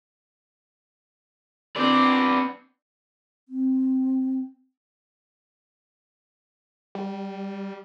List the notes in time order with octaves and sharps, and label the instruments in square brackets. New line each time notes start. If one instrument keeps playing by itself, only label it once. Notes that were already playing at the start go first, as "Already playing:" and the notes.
[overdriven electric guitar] B3 D5 [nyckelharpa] C4 D4
[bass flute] C4
[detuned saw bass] G3